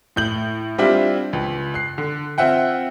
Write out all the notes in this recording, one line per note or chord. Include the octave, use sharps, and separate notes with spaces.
A2 G6 F#7
G3 C4 D4 E4 F4
C#2
F#6 C7
D3
C4 F4 E5 F#5 G5